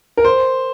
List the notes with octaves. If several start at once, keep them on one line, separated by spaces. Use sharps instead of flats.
A#4
C5